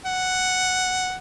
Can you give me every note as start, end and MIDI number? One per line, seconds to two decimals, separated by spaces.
0.05 1.15 78